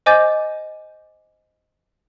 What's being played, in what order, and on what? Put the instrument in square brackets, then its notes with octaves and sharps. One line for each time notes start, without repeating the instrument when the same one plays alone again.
[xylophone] C5 D#5 G#5 D6 G6 A6